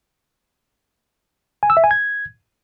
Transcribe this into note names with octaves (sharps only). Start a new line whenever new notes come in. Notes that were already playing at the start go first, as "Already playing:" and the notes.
G#5
E6
E5
G#5
G#6